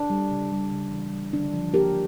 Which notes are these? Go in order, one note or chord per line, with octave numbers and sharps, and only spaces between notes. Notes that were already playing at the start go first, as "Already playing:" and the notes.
Already playing: D4
G3
C#3
G3
C#3
E3
G3
D3 D4
F3
A#3 G4 A#4